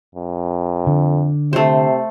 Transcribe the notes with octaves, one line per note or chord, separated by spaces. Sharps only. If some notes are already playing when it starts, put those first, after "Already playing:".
F2
D3
C3 A3 C5